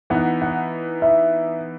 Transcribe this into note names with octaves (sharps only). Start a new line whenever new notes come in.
E3 B3 D#4 F#5
F#5
E5